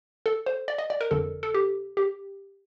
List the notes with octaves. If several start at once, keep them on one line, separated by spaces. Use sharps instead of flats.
A4
C5
D5
D#5
D5
A#4
G1 F2 D3 A4
A4
G4
G4